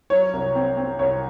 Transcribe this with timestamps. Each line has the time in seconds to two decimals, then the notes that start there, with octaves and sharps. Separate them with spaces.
0.10 F#3 C#5
0.33 C2
0.55 C4
0.77 C4
0.99 C2 C#5